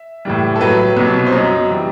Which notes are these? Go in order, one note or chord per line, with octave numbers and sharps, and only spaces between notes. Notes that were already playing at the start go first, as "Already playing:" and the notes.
Already playing: E5
A2 E3 G3
A4
A2 F#3 B4
C2 B2 F#3
C5
F#2 F#3 D#5
E3 G3